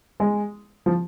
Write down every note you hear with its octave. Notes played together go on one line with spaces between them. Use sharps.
G#3
F3